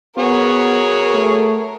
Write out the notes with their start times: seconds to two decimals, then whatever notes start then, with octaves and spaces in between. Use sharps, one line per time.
0.18 B3 F#4 G#4 A#4 C#5
1.14 A3